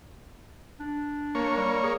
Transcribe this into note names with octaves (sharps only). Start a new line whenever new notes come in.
D4
A#3 C#5
G3
G#4